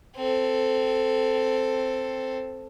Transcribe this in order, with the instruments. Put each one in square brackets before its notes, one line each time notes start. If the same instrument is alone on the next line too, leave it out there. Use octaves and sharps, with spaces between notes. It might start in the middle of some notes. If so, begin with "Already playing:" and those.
[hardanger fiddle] C4 A4